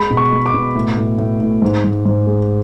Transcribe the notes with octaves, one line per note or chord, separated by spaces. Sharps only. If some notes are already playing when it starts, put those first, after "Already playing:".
Already playing: G#3 B5
B2
C#6
G#3
D6
B2
A2
A2
A2
A2
G#2
G#2
G#2
G#3